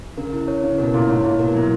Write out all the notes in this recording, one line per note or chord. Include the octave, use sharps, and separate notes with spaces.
C#3 A#4
E4
C#5
C#3 E4
B2 A#4
A#2 E4
G#2 C#5
A#2 E4
B2 A#4
F#3 E4